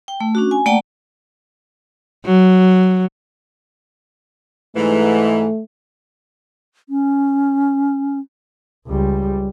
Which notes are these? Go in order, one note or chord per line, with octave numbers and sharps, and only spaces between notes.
G5
A3
C#4 D4 F#4
G#5
A3 A#3 D5 F#5 G5 A5
F#3
G#2 E3 A3
C#4
C#2 G3